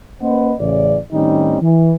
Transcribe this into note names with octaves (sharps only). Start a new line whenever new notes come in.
A#3 C#4 B4 C5 D#5 F#5
A1 C#3 D5
A2 D#3 G3 C4 C#4 D#4
E3